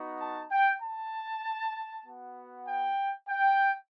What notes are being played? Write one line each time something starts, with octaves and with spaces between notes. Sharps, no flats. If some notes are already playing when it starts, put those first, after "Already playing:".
Already playing: B3 D#4 F#4
A5
G5
A5
B3 F#4
G5
G5